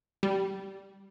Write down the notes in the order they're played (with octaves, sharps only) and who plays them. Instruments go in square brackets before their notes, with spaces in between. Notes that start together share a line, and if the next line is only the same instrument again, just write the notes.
[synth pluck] G3